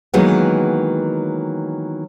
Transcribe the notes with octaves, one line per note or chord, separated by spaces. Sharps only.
D#3 E3 F#3 G#3 A#3 B3